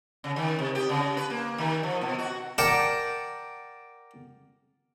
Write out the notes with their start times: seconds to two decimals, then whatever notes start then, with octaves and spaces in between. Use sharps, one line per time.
0.24 C#3
0.36 D#3
0.59 C3
0.75 G4
0.89 C#3
1.17 B4
1.30 A#3
1.58 D#3
1.83 F3
2.01 B2
2.19 F#4
2.58 A#4 D5 F#5 G5 A5